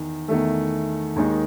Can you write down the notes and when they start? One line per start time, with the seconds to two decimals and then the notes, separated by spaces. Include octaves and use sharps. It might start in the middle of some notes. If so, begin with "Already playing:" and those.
Already playing: E2 D#3
0.28 E2 D#3 A3
1.16 D#2 D#3 G#3 D#4